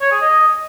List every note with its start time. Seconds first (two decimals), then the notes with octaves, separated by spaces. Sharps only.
0.01 C#5
0.11 G#4
0.21 D#5